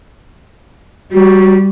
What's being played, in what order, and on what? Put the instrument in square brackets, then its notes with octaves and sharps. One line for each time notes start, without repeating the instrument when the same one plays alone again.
[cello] G3 [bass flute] F#4